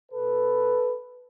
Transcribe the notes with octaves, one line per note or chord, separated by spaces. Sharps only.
B2 A4 B4